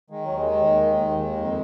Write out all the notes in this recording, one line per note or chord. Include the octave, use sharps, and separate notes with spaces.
D#3 G#3
D#2 F#3
G#3
D#3
D#2
D#3
D#2
D#3 G#3
F2